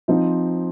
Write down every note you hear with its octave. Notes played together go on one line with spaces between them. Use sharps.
F3 C4 D#4